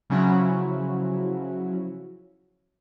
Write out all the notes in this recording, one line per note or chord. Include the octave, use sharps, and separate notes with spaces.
C#3 F3 F#3 C#4 E4 F#4